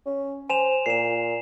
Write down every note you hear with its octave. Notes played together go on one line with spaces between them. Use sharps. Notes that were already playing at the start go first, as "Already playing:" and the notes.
C#4
C5 G#5 E7 F7
A#2 C7 E7